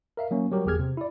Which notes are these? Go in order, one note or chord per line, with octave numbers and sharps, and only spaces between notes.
A#4 E5 F5
F#3 A#3 C#4
F#3 G3 G4 A#4
G1 E2 G4 G#4 F6 G#6
C3
E4 D5